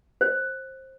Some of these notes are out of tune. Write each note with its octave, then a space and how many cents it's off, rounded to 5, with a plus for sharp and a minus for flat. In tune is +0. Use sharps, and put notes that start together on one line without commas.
C5 +20